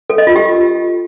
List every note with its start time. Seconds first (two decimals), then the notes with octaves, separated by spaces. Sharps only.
0.10 A4
0.18 D#5
0.27 F4
0.36 G4